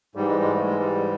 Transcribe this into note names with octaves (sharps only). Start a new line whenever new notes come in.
G#2 E3 G3
G#3
G#3
A3
G#3
G3